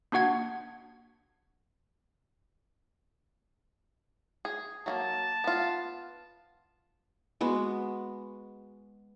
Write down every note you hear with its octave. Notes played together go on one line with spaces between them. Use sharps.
A#3 D4 F#4 F#5 G#6
G#4
F#3 A3 A#3 A5
B3 F4
G#3 B3 F#4